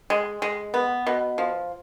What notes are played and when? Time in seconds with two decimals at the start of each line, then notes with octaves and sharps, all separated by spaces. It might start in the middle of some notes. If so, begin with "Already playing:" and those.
0.10 G#3
0.42 G#3
0.74 B3
1.07 B2
1.38 F3